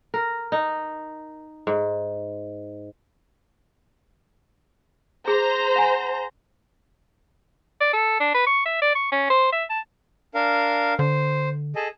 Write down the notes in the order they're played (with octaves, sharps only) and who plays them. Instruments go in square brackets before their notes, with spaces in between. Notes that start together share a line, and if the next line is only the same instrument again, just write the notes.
[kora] A#4
D#4
G#2
[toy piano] G#4 [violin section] C5 A#5
[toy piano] F#5 G#5
[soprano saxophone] D5
A4
D4
B4
C#6
E5
D5
C#6
C#4
C5
E5
A5
[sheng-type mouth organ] D4 A#4 F5
[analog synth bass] D3 [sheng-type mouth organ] C5
[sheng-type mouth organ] G#4 A4 D#5